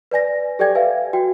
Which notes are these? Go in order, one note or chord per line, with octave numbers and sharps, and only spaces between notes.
B4 D5 G#5 A#6
G4 A4 D5 G5 G#6
B4 E5 F5 G#5
F#4 G5